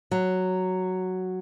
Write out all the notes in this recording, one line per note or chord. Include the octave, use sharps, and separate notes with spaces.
F#3